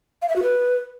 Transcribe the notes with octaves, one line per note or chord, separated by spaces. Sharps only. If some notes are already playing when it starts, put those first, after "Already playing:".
F5
E5
F#4
B4